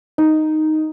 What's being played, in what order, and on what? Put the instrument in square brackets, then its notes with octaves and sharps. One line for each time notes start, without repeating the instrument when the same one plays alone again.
[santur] D#4